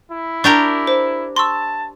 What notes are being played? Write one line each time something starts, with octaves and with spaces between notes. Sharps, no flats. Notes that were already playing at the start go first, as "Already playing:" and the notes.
E4
D4 G4 A#4 A#5 C#6
C5
A5 C6 C#6 E6